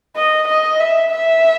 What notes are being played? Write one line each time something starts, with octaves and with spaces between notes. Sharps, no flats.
D#5
D#5
E5
E5